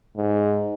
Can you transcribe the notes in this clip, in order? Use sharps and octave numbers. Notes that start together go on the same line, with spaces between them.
G#2